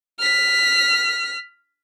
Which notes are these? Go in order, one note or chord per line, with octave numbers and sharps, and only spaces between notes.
F6 B6